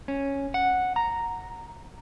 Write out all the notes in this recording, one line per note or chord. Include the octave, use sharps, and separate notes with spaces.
C#4
F#5
A#5